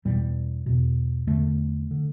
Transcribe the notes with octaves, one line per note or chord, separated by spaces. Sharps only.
E2 B2 G3
E2 B2
E2 D3 A3
D3